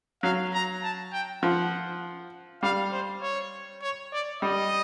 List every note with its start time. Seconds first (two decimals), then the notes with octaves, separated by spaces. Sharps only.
0.23 F#3 F5
0.53 A#5
0.83 A5
1.13 G5
1.43 F3 F#5
2.62 G3 F5
2.92 C5
3.22 C#5
3.82 C#5
4.12 D5
4.42 G3 D#5